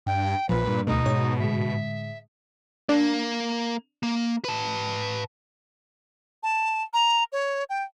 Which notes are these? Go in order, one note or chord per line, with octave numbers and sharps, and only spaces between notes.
G2 G5
A#1 A#2 F3 B4
G2
D2 B2 A3 D#4
G#2 C#5
A2 D3 G#3 E5
A#3 D4
A#3
B4 A5
A5
A#5
C#5
G5